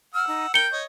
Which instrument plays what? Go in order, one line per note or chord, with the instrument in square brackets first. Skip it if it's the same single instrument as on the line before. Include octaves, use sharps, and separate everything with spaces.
[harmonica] F#5 E6 [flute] F6
[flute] D#4
[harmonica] A#4 G5 [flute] G6 [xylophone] C#7 G7
[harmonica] C#5 D#5